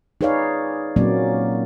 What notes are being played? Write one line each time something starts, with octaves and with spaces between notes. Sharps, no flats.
D#4 G#4 B4 C#5 D5 F5
A#2 F#3 A#3 C4 C#4 D5